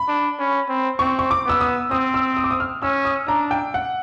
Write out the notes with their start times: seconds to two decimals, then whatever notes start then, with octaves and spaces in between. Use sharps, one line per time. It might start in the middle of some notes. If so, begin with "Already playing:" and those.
Already playing: B5
0.08 D4
0.39 C#4
0.69 C4
0.99 C4 C#6
1.19 C#6
1.31 D6
1.46 B3 E6
1.60 D#6
1.91 C4 D#6
2.14 E6
2.37 D#6
2.44 D6
2.51 D#6
2.60 F6
2.82 C#4 E6
3.05 D#6
3.28 D4 A#5
3.51 G5
3.74 F#5